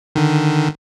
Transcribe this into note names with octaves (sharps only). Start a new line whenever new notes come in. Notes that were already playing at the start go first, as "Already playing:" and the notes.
D3 D#3